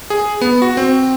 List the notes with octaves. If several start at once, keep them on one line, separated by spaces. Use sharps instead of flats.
G#4
B3
F#4
C4